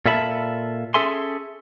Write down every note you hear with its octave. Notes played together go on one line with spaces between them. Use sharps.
A#2 F4 A4 E5 A5 B5
C#4 G#4 A4 E5 G#5 C6